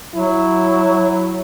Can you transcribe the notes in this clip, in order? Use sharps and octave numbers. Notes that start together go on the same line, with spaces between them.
F#3 E4